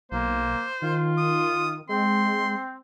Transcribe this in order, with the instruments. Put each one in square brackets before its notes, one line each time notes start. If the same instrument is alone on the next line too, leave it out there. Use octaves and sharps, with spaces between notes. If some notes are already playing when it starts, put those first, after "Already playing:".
[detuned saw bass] B1 [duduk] A#3 [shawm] C5
[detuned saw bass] D#3 [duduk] F4
[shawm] D#6
[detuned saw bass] G#3 [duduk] C4 [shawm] C6